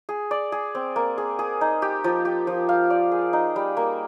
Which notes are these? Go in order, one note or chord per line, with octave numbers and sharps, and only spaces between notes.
G#4
D5
G#4
C4
A#3
G#4
G#4
D#4
G4
F3
G4
F3
F5
D5
G#4
D#4
G3
A#3